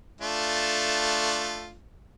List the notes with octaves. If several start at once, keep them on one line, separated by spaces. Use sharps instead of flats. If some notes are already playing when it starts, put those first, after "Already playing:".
A3 D4 F4